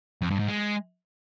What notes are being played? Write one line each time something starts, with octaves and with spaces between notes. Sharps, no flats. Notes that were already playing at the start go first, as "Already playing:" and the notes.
F2
G2
G#2
G#3